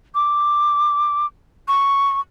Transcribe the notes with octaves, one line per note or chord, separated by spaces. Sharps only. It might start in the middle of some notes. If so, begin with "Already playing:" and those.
D6
C#6